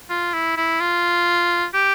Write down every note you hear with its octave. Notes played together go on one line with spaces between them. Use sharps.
F4
E4
E4
F4
G4